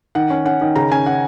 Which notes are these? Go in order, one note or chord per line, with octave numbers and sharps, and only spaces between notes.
D#3 F#5
C#4
C#4 F#5
D#3
C#3 A#5
C#4 G#5
C#4 F#5